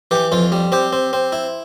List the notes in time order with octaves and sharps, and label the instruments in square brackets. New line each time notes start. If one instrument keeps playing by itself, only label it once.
[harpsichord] E3 G4
F2 F4
G3
C4 G4
C4
C4
E4